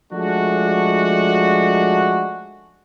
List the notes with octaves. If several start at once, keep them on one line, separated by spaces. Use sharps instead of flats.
F3 G#3 A3 D4 F#4